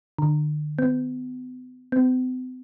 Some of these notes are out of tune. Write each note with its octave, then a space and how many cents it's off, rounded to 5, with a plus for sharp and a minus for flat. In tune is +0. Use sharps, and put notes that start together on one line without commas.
D3 +40
B3 +40
C4 -45